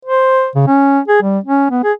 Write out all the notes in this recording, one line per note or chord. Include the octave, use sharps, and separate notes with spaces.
C5
C#3
C#4
G#4
G3
C#4
B3
G#4